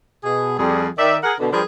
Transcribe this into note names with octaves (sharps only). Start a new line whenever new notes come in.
B2 G#4
F2 G3 G#4
D#3 D5 E5
G#4 A#4 F#5
B2 D3
F3 G3 D4 G#4 A#4 B4